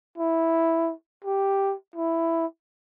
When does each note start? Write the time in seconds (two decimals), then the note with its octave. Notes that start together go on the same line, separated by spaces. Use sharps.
0.18 E4
1.25 G4
1.96 E4